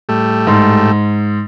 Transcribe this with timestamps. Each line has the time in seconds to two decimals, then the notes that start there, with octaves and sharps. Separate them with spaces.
0.09 A2 G3 A3
0.47 G#2